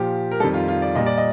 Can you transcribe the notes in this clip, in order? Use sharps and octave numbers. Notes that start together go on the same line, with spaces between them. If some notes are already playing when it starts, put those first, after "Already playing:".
Already playing: A#2 F3 G4
A#4
F2 D#3 G3 A4
F4
F4
D5
A#2 G3 D#5
D5
D#5